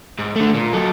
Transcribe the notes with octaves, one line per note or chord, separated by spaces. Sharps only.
G#2
D3 A3
A#2
F#3 A4